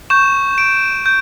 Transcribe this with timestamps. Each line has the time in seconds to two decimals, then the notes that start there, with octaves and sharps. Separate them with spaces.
0.10 C#6 G6 E7
0.58 D7
1.06 G6